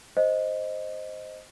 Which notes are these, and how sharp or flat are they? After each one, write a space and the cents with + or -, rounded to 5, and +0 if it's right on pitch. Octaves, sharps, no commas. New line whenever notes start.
C5 +0 D#5 +0